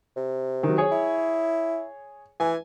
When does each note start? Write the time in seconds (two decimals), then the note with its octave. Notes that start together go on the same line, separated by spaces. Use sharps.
0.16 C3
0.63 D#3 F#3
0.78 G#4 C#5
0.92 E4
2.40 E3 G#5